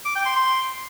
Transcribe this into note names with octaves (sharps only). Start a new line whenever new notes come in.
D6
G5
C6
C6